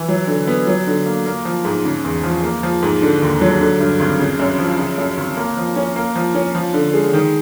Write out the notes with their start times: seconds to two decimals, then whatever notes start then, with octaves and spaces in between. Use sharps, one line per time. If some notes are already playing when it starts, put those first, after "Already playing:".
Already playing: E3
0.09 F#3
0.27 D3
0.47 B3
0.67 F#3
0.87 D3
1.06 A#3
1.26 A#3
1.45 F3
1.65 G#2
1.85 C#3
2.05 E2
2.23 F3
2.43 A#3
2.63 F3
2.83 G#2
3.02 D3
3.22 D#2
3.41 F#3
3.61 D3
3.80 G2
4.00 G#1
4.19 C#3
4.39 F#2
4.59 F3
4.79 C#3
4.98 F#2
5.17 G#1
5.37 A#3
5.57 F3
5.76 C#4
5.96 A#3
6.16 F3
6.35 C#4
6.55 F3
6.74 D3
6.94 G#3
7.13 D#3